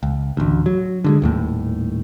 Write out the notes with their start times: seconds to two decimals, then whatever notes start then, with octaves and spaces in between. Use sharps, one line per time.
0.03 C#2
0.37 A1 D2
0.66 F#3
1.04 D3 F#3 G#3
1.22 D#1 D#2 A2